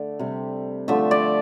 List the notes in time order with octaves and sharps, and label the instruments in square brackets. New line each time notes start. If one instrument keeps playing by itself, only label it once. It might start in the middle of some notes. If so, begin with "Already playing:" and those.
Already playing: [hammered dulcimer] D3 A3
C3 G3
D3 F3 A3 E5
D5